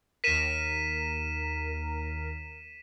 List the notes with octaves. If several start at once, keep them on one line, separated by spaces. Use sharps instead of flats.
D#2 A#4 B6 D#7 E7